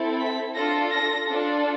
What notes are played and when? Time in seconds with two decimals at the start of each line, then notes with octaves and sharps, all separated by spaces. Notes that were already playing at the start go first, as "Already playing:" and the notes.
Already playing: C4 E4 A4
0.20 B6
0.55 D4 F4 A4 A#6
0.92 A#6
1.27 D4 F4 A4